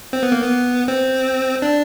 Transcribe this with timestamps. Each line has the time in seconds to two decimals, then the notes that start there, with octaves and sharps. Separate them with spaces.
0.13 C4
0.23 B3
0.32 A#3
0.42 B3
0.88 C4
1.62 D4